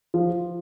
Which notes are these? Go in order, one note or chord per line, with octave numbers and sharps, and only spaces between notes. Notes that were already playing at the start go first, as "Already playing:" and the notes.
F3